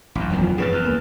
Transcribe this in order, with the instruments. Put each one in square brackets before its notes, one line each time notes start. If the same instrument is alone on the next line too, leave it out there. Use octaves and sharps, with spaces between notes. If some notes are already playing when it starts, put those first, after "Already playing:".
[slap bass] A1 F#2
F#1 E2 D#3
[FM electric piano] F3
[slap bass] G2 C#3 [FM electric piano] G#4 B4 A6
[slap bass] E2
[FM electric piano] C#2 A#3 B4